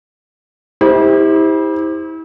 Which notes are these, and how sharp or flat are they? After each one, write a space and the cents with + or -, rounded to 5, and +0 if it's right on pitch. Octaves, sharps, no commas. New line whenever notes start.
E4 -35 G4 +25 C5 +0